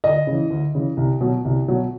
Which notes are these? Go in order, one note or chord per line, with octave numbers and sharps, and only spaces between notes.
D2 D#5
C#3
E3
D2
C#3 E3
C2
B2 F#3
C2
B2 F#3